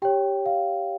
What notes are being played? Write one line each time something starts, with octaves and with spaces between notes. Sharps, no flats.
G4 C#5 G5
F5